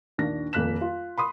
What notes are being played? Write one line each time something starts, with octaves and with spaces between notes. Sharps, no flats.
A#1 D#2 D4 A#6
D#1 F2 A#3 F#6 B6 E7
F4
B5 C6 D#6